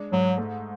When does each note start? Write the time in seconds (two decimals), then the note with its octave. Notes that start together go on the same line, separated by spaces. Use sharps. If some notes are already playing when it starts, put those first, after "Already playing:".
Already playing: G#3 D4
0.12 G#2 F#3
0.38 A3